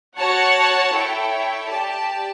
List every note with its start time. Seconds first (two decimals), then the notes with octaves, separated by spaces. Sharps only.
0.18 F#4 C#5 F#5 A5
0.93 E4 A4 C#5 G5
1.68 G4 D5 A5